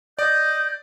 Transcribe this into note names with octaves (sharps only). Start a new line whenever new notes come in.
D5 D#5 G6